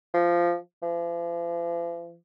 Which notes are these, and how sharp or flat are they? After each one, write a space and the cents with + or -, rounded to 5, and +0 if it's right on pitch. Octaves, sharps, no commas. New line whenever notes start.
F3 -10
F3 -45